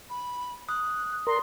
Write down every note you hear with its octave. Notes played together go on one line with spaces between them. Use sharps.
B5
D#6 F#6
A#4 D5 C6